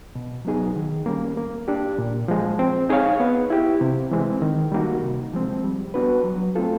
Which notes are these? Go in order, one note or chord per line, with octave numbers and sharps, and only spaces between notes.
B2
F#3 B3 D#4 G#4
D#3
G3 A#3 C#4
A#3
D4 G4
A#2
F3 G#3
C4
D#4 G#4 C#5 F5
B3
E4 G4
C3
E3 G#3 C4
D#3
G3 A#3 D#4 F#4
C3
F3 G#3 C4
G3
B3 D4 F#4 B4
F#3
A3 C4 F4 A4